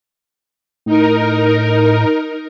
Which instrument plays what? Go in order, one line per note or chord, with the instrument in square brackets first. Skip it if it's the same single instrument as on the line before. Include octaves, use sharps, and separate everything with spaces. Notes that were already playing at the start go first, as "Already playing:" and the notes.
[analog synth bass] A2 [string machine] D#4 A#4